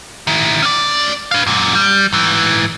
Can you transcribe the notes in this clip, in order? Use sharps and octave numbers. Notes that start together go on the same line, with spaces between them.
D#3 E4
C#4 D5
B4 F5
F#2 A#2
G3
G#2 E3